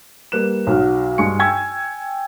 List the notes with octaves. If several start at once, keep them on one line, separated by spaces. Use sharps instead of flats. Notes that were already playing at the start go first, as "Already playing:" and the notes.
G3 A#3 B4 F#6 E7
B1 F#3 F6
G2 G#3 G#5 C#6 C#7
G5 G#5 C#6 E6 G#6